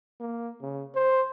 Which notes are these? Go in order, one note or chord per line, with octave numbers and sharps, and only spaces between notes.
A#3
C#3
C5